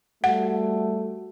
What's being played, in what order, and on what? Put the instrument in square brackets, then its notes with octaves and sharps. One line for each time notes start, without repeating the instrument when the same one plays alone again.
[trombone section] G3 A3 F#4 [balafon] F#5